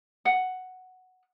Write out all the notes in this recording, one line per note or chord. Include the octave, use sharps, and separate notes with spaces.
F#5